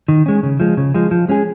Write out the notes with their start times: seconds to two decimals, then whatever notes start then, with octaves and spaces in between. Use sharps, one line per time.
0.08 D#3
0.26 G#3 C#4
0.43 C#3
0.60 F3 G#3
0.77 C#3
0.94 F3 G#3
1.11 F3
1.28 G#3 C#4 G#4